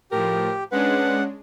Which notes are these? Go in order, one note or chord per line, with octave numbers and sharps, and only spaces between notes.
A2 F3 G4 A#4
G#3 C#4 D4 B4 F#5